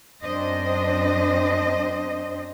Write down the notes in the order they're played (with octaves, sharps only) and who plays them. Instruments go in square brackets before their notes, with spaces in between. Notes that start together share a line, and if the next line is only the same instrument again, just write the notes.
[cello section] F#2 C4 D4 C5 D#5